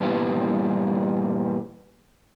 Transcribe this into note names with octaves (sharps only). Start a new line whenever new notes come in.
G2 A#2 E3 G3 B3